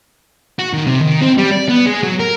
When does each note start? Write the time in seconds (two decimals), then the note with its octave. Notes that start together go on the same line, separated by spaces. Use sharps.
0.59 F#4
0.74 D#3
0.87 C3
1.01 D#3
1.21 C4
1.38 G3
1.52 D5
1.69 B3
1.86 G#3
2.03 F#3
2.19 A#4